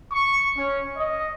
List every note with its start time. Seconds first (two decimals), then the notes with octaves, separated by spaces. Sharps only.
0.13 C#6
0.57 C#4
0.97 D#5